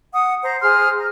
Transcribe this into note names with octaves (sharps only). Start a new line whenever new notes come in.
F#5 D#6
C5 A#5
G#4 C5 C6 F6
A#5